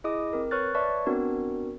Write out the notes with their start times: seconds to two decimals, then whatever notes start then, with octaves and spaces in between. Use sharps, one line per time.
0.04 E4 G#4 D#5 D6 D#6
0.33 C4 A#4
0.51 B4 C#5 C#6 F6 F#6 A6
0.75 B4 C#5 D5 E5 A5 C#6
1.06 B3 C4 D4 F#4 A#4